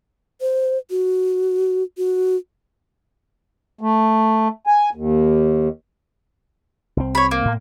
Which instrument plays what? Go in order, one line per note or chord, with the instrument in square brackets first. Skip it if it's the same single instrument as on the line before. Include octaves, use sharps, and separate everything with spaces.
[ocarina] C5
F#4
F#4
[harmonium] A3
G#5
D#2
[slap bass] C2 C4
[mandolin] C#5 B5
A#3
[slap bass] A2